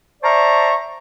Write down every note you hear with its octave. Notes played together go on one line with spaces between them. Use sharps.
C5 D5 E5 A5 A#5 C#6